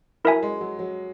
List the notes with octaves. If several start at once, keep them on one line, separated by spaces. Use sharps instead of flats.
F#3 E4 A#4 E5 G#5
G#3
F#3
F#3